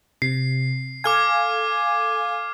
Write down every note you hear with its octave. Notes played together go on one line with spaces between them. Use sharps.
C3 C7
A4 F5 G#5 D6 F6 G#6